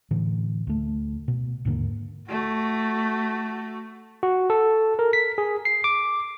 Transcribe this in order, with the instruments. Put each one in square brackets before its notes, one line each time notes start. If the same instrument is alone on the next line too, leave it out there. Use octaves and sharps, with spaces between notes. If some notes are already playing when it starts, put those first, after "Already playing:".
[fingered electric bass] A2 D3 E3
D2 A3
B2
D#2 G#2 D3 A#3
[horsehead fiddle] A3 F#4
[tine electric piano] F#4
A4
A#4
B6
G#4
C7
D6